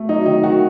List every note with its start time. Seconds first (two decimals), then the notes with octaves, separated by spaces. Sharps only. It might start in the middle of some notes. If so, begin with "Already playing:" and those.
Already playing: A3
0.09 F#3 D#4
0.26 D#3 D#4
0.44 D#3 F#4